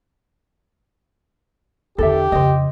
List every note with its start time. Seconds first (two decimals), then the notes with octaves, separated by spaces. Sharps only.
1.98 E2 D3 G4 A4 E5
2.32 F2 C#3 C5 D#5